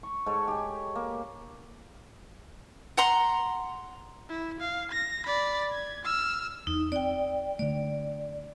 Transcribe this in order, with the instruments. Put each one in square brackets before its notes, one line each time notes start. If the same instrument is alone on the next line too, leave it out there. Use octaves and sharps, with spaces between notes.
[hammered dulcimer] C#6
G#2 A4 C#5
G4 G#5
A#3
[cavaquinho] F#5 A#5 C6
[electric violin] E4
F5
A#6
D5 B5
G#6
E6 F6
[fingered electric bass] E2 [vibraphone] D#4
[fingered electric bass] C4 [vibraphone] D5 G5
[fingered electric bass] D3 A3 [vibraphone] D5